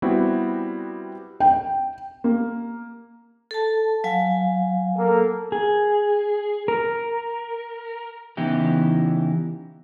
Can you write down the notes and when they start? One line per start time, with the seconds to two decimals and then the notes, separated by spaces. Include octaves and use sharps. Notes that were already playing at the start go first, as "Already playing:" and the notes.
0.02 G3 B3 C4 E4 F#4
1.40 G5
2.24 A#3
3.51 A4 A5
4.04 F#3 F5 G#5
4.98 A#3 A4
5.52 G#4
6.68 A#4
8.37 C#3 E3 B3 D#4 E4 G4